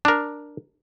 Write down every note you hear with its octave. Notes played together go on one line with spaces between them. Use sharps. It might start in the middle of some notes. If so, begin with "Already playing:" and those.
D4 A#4